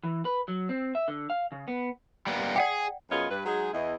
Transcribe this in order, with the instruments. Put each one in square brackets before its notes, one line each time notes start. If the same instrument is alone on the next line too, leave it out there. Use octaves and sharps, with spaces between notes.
[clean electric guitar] E3
B4
F#3
C4
E5
D3
F5
C#3
B3
[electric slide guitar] G3 A#3 B3
[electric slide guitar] G4 G#4 [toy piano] D5 F#5 G5
[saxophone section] F#2 B3 F4 G#4 C#5 D#5
G2 B4
F#3 G#3 D#4 G#4
E2 E4 D#5